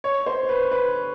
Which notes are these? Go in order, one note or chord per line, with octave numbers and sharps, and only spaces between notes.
C#5
C5
B4
B4